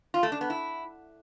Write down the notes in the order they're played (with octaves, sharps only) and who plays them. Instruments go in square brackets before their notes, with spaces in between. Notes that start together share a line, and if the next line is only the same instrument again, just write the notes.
[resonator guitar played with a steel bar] F4
A3
D4
B3
E4